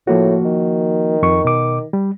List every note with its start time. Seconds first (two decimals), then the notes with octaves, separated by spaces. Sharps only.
0.07 A2 F3 A#3 F#4
0.45 D#3
1.23 F2 C#6
1.45 B2 D6
1.93 G3